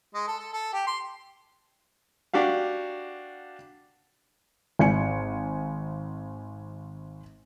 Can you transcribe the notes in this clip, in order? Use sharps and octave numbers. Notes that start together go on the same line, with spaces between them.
G#3
A4
A4
A4
G4
C6
D4 F#4 G4 F5
G#1 G#5 C#7